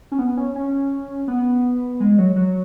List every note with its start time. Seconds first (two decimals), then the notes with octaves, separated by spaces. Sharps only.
0.12 C#4
0.19 B3
0.37 C#4
0.55 C#4
1.28 B3
2.00 G#3
2.18 F#3
2.36 F#3